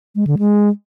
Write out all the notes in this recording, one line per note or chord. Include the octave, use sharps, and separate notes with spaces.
G#3
D3
G#3